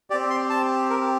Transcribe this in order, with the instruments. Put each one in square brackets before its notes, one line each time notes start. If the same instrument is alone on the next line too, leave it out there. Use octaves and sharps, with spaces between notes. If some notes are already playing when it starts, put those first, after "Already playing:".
[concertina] C4 G4 D5
C6
A5
A#4